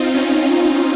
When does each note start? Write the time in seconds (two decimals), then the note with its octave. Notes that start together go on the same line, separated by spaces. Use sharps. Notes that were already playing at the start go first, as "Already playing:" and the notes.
Already playing: C4 D#4 F4
0.14 C#4